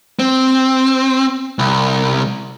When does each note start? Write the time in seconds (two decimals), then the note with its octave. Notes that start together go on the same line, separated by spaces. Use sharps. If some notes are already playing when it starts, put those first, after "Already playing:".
0.19 C4
1.59 C2